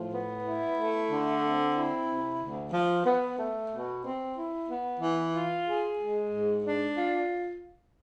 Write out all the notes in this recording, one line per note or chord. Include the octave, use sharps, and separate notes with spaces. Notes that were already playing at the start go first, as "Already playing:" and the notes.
Already playing: A2 F3
B3
E4
A3
D3
C4
E4
C3
D2
F3
B3
A3
B2
C4
E4
B3
E3
F4
G#4
G#3
G#2
D4
F4